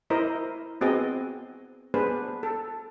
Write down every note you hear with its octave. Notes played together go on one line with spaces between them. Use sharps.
E4 A#4 C5 D#5
B3 C4 F#4 G#4 D#5
B3 D4 G#4 B4 C5
A4